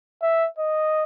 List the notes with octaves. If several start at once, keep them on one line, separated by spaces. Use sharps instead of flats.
E5
D#5